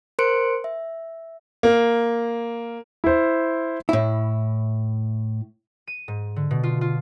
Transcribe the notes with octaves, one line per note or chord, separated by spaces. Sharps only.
A#4 C5 C6 F#6 C#7 D7
E5
A#3
E4 C5
A2 E4
D#7
G#2
D3
B2
F4
F4